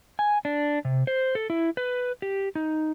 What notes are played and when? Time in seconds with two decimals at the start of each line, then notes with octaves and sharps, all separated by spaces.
0.19 G#5
0.45 D4
0.85 C3
1.07 C5
1.35 A4
1.50 E4
1.77 B4
2.22 G4
2.55 D#4